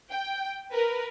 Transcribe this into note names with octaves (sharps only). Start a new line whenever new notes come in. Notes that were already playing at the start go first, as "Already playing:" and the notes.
G5
A#4 B4